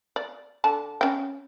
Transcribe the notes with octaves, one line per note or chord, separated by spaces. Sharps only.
D5
D3 D4 A5
C#4 G5